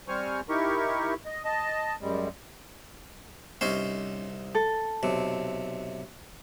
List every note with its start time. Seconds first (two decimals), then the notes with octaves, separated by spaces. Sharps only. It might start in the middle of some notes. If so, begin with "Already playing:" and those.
0.08 G3 C4 C5 G#5 C#6 F6
0.49 D#4 E4 G4 A#4 C#6
1.26 D#5
1.45 D#5 A5
2.01 F#2 G3 G#3
3.61 C2 C#4 D#4 C5
4.55 A4
5.03 B1 C3